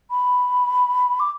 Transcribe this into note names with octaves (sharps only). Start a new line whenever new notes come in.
B5
D6